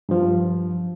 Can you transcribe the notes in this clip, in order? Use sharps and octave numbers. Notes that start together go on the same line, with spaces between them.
G2 F3